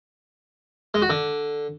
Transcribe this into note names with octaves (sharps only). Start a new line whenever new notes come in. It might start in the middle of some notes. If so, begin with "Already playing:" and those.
G#3
F#4
D3